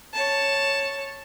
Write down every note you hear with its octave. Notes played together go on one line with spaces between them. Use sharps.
C#5 A5